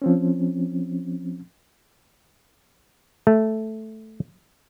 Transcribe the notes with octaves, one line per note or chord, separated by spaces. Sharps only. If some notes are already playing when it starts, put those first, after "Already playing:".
F3 C4 C#4
A3